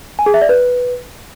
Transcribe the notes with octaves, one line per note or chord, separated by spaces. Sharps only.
G#5
G#4
E5
D5
B4